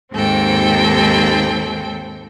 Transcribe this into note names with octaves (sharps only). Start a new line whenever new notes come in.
D#2 G#2 C4 A4 G5